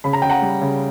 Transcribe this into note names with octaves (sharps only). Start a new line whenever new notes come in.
C#3 B5
A#5
C#3 G5
F#5 A#5
G3
C#3